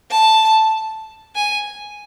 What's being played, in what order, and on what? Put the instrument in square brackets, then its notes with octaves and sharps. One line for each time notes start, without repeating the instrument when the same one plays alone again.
[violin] A5
G#5